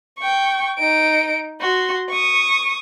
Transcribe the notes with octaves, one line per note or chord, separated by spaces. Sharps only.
G5 C#6
D#4 D7
F#4 C6
C#6 D#6